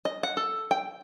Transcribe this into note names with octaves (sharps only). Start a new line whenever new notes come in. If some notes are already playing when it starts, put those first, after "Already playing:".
D#5
F#5
A4
G5